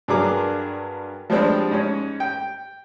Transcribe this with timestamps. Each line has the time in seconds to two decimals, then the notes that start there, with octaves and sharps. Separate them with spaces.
0.08 G2 F#3 D4 G#4 A#4 D6
1.30 F3 G3 G#3 C4 D4
1.71 G#2 C#4
2.20 G5